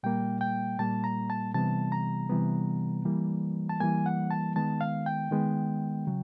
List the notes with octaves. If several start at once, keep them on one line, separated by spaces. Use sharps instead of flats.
A#2 G3 A#3 G5
G5
A#2 G3 A#3 A5
A#5
A5
C3 E3 G3 B3 A5
A#5
C3 E3 G3 B3
E3 G3 A#3
A5
E3 G3 A#3 G#5
F#5
A5
D#3 G#3 B3 A5
F5
G5
D#3 G#3 B3
C#3 F#3